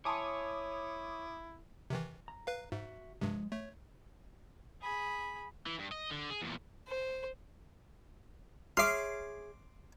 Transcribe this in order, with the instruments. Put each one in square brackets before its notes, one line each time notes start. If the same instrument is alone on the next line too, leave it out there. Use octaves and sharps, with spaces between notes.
[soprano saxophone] E4 [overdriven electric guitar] C#5 [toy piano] G#5 A5 C6 [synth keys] D6 D#6
[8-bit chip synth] C3 D#3 E3
[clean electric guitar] A#5
[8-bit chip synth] B4 F5
[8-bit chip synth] G#2 [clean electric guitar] F#4 E5
[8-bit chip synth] G2 C3 [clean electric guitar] F3 F#3 G#3
[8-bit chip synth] A3 [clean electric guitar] C#5
[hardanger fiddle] G#4 B5
[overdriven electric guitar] E3
G2
D#5
D3
G#4
E2 A#2
[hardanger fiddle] C5
[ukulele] G#4 C#5 E5 [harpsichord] C6 D6 [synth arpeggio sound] F6 C7